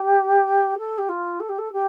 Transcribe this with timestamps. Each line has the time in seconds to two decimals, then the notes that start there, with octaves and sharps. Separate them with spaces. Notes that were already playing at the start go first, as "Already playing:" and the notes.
Already playing: G4
0.78 A4
0.98 G4
1.09 F4
1.40 A4
1.49 G4
1.58 A4
1.72 G4